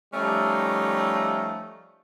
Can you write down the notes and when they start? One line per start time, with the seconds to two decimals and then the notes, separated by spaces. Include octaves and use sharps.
0.14 F3 G3 A3 C#4 D#4